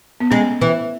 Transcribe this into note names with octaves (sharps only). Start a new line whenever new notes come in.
B3
G#3 C#4
E3